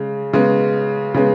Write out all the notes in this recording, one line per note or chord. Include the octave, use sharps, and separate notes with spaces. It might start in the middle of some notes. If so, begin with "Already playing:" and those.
Already playing: C#3 G#3
C#3 G#3 B3
C#3 G#3 B3